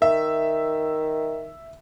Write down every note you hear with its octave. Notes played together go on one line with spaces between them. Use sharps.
D#3 E5